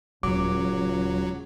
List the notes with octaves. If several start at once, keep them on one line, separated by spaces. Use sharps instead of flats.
D#1 C#2 F#3 D6